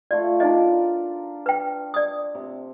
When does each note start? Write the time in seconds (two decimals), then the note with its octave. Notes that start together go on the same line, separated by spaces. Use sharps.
0.11 A3 F4 D5
0.40 D4 D#4 F4 A#4 D#5
1.46 B4 G5
1.94 D5 D#6
2.35 C3